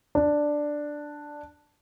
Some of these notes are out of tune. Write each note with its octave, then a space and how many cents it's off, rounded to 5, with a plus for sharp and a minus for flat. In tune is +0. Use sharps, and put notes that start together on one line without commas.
D4 +5